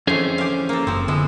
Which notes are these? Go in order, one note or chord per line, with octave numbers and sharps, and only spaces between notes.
F2 D3 E3 A3 C#4 G#4 C5
G4 F5
A#3 A4
F#1 F3 C4
D3 F3 G#3 B3 E4